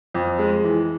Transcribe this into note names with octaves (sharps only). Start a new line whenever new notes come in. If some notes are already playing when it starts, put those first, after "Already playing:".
F2
G#3
E3